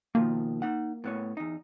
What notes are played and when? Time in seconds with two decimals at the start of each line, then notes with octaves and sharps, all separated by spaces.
0.15 B2 D#3 F3 A#3
0.62 D#4 F#5
1.04 A2 B3 C#5
1.37 E2 D#4